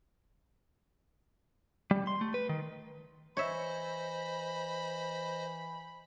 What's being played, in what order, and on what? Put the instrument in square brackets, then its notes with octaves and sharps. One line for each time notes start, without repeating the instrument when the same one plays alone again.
[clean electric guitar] G3
C6
A3
B4
D#3
[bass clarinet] E3 [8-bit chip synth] C5 D#5 [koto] C#5 E5 [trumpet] B5